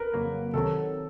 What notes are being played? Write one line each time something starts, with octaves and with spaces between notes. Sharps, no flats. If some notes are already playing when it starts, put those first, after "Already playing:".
Already playing: A#4 B4
F2 C#3 F#3 A#3
C3 D#3 F#3 A4